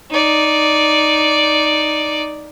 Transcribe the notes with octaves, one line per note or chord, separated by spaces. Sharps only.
D#4 D5